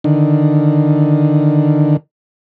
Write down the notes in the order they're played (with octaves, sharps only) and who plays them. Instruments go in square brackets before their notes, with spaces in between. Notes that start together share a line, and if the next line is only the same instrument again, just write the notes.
[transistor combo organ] D3 D#3